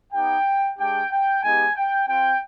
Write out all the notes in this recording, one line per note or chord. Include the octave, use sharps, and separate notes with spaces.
B3 D#4 G4 G5
G#3 D4 G4 G5
G5
G#3 B3 D#4 G4 G#5
G5
C4 F4 G5